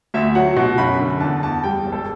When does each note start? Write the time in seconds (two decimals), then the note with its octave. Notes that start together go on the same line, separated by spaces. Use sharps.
0.14 D2 E5
0.35 F#3 F#5
0.57 B2
0.78 F#2 B5
1.00 D3
1.20 E2 A5
1.43 E2 A5
1.64 G3 G5
1.85 E1
1.92 A4